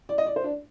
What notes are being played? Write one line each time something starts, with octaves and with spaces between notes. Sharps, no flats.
D5
D#5
D5
C5
D4